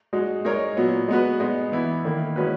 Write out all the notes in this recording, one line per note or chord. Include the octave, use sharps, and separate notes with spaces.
G#3 D#4 F#4
G#3 D#4 A#4 C#5
A#2 F#3 B3
G#3 B3 F#4 B4
G#3 B3 D#4
E3 B3 E4
D#3 A#3 E4
G#3 C#4 F#4 B4